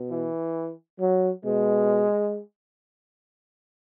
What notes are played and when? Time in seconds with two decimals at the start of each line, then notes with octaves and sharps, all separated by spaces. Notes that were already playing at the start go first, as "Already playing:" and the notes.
Already playing: B2
0.10 E3
0.99 F#3
1.44 B2 G#3